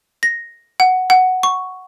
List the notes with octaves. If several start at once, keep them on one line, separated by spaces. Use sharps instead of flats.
A#6
F#5
F#5
C#6